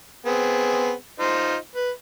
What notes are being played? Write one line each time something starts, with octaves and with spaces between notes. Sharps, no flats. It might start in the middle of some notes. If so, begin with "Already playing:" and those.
B3 C4 G#4
D#4 F4 C5
B4